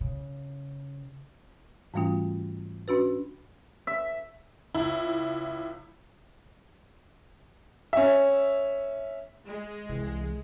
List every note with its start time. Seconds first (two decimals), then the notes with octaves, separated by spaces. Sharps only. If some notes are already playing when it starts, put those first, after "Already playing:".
0.01 C#3
1.94 G#2 E3 G3 A3 C#4 F4
2.88 C#4 D4 F#4 B4
3.87 E5
4.75 C#2 E4
7.93 C#4 E5
9.48 G#3
9.89 C2 E3